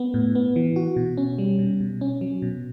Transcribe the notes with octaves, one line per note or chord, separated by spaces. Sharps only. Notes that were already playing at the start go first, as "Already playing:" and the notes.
Already playing: B3
A2
B3
E3
F#4
B2
C#4
G3
B2
B2
C#4
F#3
B2